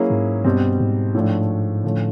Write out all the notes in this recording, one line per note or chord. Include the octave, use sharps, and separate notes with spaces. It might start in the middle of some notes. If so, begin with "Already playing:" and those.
Already playing: F#3 A#3 C#4 E4 G#4
G#2
G2 B2 G3 C4
G#2
A2 F3 A3 D4
A2 D3 F3 A3 C#4